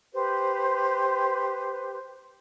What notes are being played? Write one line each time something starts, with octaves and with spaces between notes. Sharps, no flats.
G4 B4 C5